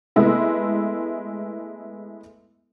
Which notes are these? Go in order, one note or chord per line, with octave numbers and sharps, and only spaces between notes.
G#3 A3 B3 E4 A4